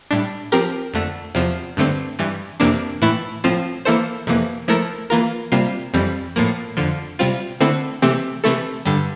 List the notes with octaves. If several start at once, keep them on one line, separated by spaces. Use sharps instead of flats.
A2 G3 D4
F3 C4 G4 A#4
F2 D3 A3
E2 C3 F3
G2 D3 A3 C4
G2 E3 G3
F2 C3 E3 A#3 D4
A2 E3 A3 E4
A2 F3 C4 F4
E3 A#3 E4 A4 C5
F2 C3 E3 A#3
F3 A3 E4 A#4
E3 A#3 F4 A#4
C3 G3 A#3 F4
F2 E3 G3 C4
A2 F3 A#3
F2 D3 F3
C3 G3 C4 F4
D3 A3 C4 E4 A4
C3 E3 A3 C4 G4
C3 E3 A3 E4 A4
G2 D3 G3